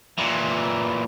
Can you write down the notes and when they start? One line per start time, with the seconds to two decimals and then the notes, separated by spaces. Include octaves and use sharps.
0.18 A#2 E3